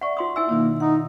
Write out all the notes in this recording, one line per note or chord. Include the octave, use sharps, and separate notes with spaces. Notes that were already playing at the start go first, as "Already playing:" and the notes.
D5 E5 F#5 C#6
F4 C6 D#6
E4 E5 G#5 E6
B2 D#3 A#3 D#4
D#4 F#5